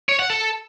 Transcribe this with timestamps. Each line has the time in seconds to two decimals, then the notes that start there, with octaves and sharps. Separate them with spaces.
0.09 C#5
0.19 F#5
0.30 A4